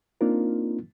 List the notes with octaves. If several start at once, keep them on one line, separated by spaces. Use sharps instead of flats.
A#3 C4 D4 D#4 F4 A#4